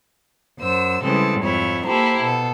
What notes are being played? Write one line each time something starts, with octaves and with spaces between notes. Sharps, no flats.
F#2 C5 E6
C#3 E3 G3 G#3 C4 A4
F2 G#2 E4 C#5
A#3 E4 G4 A4 C5 A#5
B2 A4